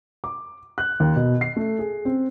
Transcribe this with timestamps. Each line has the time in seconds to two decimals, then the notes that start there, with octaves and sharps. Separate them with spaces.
0.24 D6
0.78 F#6
1.00 D#2
1.16 B2
1.41 C7
1.56 A3
1.79 G#4
2.05 C4